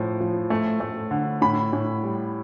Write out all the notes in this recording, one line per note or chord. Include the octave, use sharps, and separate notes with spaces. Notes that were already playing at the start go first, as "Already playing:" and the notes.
Already playing: A2 F3
F3
A3
A3
D3
A2 B5
A2
G3